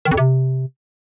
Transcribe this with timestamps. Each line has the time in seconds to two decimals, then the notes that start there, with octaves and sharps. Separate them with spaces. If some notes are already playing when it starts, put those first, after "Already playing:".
0.05 D#3
0.11 F2
0.17 C3